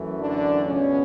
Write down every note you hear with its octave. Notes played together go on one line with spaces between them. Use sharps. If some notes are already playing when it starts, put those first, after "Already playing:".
Already playing: F#2 E3 A3
D3 D4
C#2 B2 G#3 B3 C#4